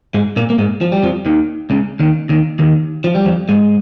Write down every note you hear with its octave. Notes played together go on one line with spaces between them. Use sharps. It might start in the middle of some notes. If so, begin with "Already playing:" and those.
G#2 G#3
A#2 A#3
A#3
G#2 G#3
F3
G3
F2 F3
D#2 D#3
C#2 C#3
D#2 D#3
D#2 D#3
D#2 D#3
F3
G3
F2 F3
G#2 G#3